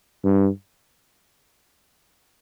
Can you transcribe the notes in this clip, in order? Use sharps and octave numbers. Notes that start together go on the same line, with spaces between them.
G2